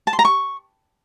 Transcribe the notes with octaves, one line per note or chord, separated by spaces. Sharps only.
A5
C6
A#5
C#6